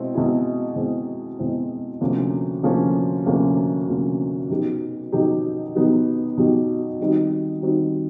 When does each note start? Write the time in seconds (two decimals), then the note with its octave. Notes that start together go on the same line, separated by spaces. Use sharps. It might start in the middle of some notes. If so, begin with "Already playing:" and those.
Already playing: B2 G#3 C4 E4
0.14 B2 G#3 C4 E4 G#4
0.76 B2 G#3 C4 E4 G#4
1.38 B2 G#3 C4 E4 G#4
2.01 D2 C3 F3 A#3 C#4
2.63 D2 C3 F3 A#3 C#4
3.26 D2 C3 F3 A#3 C#4
3.88 D2 C3 F3 A#3 C#4
4.50 B2 F#3 B3 D#4 G4
5.12 B2 F#3 B3 D#4 G4
5.75 B2 F#3 B3 D#4 G4
6.37 B2 F#3 B3 D#4 G4
7.00 D#3 G3 C4 D#4 F#4
7.62 D#3 G3 C4 D#4 F#4